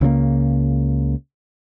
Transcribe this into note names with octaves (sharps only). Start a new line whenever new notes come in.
C#2 C#3 F3 A#3